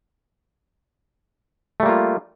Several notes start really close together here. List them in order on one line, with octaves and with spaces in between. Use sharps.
A3 G3 A#3 F4